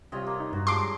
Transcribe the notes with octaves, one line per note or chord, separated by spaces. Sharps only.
C3 G3 F4 C#5 D#5
A#3
D#4
G2 F#4
F3 G3 G#3 C6 D6